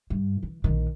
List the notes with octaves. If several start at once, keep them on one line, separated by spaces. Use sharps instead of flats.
G2
E3
A#1 D#3